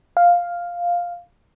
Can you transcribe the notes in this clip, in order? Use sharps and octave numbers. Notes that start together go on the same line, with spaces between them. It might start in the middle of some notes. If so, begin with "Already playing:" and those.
F5